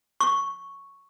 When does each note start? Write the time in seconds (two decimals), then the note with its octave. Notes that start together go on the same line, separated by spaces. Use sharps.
0.20 C#6